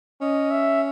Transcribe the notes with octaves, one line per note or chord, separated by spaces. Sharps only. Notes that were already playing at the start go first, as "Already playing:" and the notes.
C#4 D#5
E5